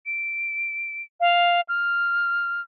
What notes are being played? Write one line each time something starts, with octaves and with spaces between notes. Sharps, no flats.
D7
F5
F6